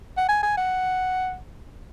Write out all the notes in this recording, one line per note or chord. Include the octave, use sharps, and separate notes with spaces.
F#5
G#5
G#5
F#5